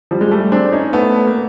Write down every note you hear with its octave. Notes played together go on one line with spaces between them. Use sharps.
F3 G3
G#3
G3 A3
C4 D4
C#4 D#4
A3 B3
A#3